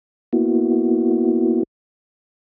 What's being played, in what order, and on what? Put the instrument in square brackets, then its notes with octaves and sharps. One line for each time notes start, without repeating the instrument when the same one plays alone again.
[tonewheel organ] A#3 B3 E4 F#4